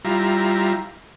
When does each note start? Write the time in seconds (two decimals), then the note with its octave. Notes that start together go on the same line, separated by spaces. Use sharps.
0.05 G3 E4 F4 A#5